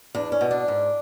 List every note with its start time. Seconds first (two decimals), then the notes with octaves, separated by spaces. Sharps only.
0.15 E2 D4
0.32 C#4
0.41 B2
0.51 D4
0.68 G#2